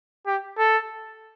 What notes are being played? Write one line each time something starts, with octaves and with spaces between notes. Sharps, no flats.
G4
A4